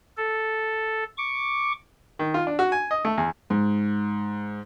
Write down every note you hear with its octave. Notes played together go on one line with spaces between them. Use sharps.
A4
C#6 D6
D#3
F4
D4
F#4
G#5
D#5
A3
E2
G#2